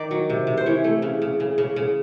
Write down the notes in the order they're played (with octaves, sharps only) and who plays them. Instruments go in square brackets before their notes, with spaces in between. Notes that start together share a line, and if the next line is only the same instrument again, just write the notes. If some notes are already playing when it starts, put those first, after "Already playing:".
Already playing: [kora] D#3 D5
F#3
C3
C3
C5
E3 C#5
A3
C#3
C#3
C#3
C#3
C#3